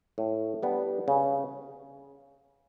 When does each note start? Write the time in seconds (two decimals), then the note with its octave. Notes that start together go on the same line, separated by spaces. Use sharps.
0.18 A2
0.63 G3 B3 D4
1.08 C#3